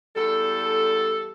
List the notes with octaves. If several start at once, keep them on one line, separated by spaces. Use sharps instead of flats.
E2 G3 A4